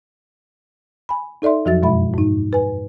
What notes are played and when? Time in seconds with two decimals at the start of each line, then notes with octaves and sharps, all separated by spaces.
1.09 G#5 B5
1.42 D#4 A4 D5 E5 C6
1.65 F2 F3 F#3 F#4 E5 A6
1.82 F#2 B2 G#3 E5 B5
2.14 G#2 D#4
2.53 B4 G#5